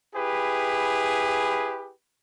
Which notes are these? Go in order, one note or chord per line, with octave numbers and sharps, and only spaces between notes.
E4 G4 G#4 B4